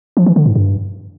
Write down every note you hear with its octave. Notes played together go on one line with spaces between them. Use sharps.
F3
E3
D3
G#2
G2